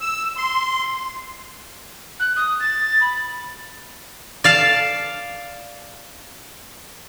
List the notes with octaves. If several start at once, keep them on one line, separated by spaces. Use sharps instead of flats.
E6
C6
F#6
D#6
A6
B5
D5 F5 A5